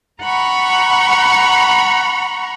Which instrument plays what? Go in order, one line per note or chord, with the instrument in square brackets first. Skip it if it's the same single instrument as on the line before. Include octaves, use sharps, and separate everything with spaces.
[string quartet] F#5 A#5 B5 C#6